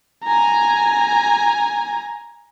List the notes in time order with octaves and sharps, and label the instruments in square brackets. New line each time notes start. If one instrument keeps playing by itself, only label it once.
[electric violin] G#5 A#5